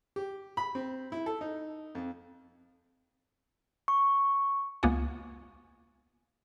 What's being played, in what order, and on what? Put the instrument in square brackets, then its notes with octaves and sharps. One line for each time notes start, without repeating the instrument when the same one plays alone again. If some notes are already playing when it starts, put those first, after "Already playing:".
[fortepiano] G4
B5
C4
E4
A4
D#4
F2
[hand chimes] C#6
[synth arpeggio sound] C#2 A#3 B3 F4 F#5 G#5